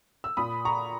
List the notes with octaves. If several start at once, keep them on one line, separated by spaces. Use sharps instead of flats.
E6
A#2 B5 D#6
A#5 C#6